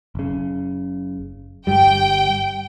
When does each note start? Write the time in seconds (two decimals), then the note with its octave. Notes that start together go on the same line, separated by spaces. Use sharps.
0.15 F#1 C#3
1.67 G1 G2 G3 G5